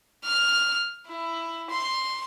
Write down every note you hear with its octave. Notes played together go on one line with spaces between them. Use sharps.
F6
E4
C6